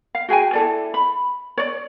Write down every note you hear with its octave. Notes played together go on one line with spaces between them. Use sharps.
F5
F#4 G#4 G5 G#5
E4 A4 D5
B5
C#5 D5